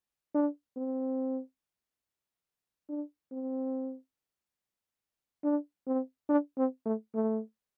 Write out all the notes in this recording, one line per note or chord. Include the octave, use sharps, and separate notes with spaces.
D4
C4
D4
C4
D4
C4
D4
C4
A3
A3